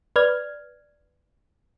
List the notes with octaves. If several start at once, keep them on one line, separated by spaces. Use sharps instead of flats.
B4 D5 F6 G#6